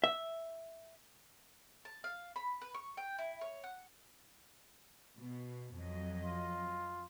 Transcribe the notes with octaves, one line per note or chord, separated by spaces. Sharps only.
E5
A5
F5
B5
B4
C#6
G5
E4
C#5
F#5
B2
F2 F#3 D#5
F4